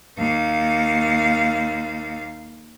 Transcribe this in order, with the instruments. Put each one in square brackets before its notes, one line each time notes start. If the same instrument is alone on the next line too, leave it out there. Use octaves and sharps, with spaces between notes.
[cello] D#2 F5